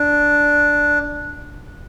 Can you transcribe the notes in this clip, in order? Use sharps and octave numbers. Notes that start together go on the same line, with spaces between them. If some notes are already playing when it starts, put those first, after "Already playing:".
Already playing: D4